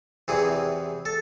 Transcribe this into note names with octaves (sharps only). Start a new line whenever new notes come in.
E2 C3 E3 G#4
A4